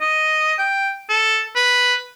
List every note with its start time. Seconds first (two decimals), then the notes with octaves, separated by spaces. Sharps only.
0.01 D#5
0.59 G5
1.09 A4
1.55 B4